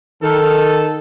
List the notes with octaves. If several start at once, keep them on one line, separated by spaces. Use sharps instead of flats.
D#3 A4